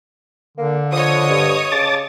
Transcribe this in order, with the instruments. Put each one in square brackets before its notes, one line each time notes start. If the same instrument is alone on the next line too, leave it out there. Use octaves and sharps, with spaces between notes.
[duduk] D3 [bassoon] A#3
[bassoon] F3 [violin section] C#5 D#5 D#6
[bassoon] G2
[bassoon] C#3 [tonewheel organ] A5 D6 A6